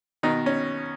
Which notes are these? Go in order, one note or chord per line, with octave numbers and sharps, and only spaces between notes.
B2 D#3 D#4
C#4